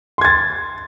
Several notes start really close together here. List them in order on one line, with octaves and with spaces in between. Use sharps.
C6 G#6 A6